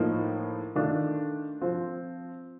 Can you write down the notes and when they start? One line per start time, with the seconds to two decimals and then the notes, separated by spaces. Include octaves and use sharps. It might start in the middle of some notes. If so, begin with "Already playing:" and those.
Already playing: A2 F3 A#3 D#4
0.75 D#3 A3 D4 F4
1.61 F3 C4 F4